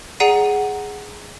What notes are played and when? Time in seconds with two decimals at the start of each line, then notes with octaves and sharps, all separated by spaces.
0.20 G#4 D5 F#5 A#5 C7 D#7